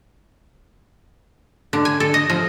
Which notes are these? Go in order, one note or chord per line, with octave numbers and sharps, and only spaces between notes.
D3
G#5
A4
D#5
F3